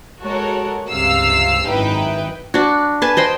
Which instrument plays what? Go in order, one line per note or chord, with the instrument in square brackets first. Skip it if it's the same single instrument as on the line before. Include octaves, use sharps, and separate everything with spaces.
[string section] G#3 F#4 A4 A#4 C#5
C#2 G2 C3 F5 E6 C7
G#1 F#2 D#4 E4 B4 G5
[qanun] D4 F#4
B4 G#5 A5
C5 D#5 G5 C6